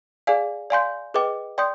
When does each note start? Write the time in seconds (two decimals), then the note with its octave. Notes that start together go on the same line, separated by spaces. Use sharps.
0.27 G#4 D5 F5 G#5
0.70 D5 F5 G#5 C6 G6
1.14 G#4 B4 D#5 G5 D6
1.58 D5 G5 C6 D#6 G6